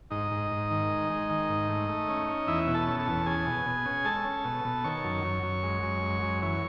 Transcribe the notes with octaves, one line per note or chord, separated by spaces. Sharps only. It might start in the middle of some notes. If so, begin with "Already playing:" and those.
G#2 D#4 D#5
G#2
G#2
D#3
G#3
G#3
D#3
G#2
A3
A3
C#4
C#4
E2 E4 E5
B2
A4 A5
C#4
A4 A5
E2
C#4 G#4 G#5
B2
B2
C#4
G#3 A4 A5
C#4
B2
B2
D#3 C#5 C#6
F#2
F#2
F#2
G#3
F#2
G#3
F#2
E3 C#5 C#6